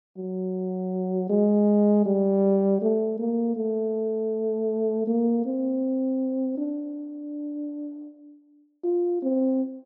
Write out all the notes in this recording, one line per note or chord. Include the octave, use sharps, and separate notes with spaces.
F#3
G#3
G3
A3
A#3
A3
A#3
C4
D4
F4
C4